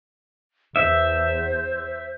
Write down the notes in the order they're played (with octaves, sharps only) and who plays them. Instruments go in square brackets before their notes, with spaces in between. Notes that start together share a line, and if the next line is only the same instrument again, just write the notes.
[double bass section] E2 [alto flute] C5 [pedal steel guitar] E5